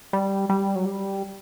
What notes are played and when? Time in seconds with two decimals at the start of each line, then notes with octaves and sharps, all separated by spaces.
0.13 G3
0.49 G3
0.75 F#3
0.85 G3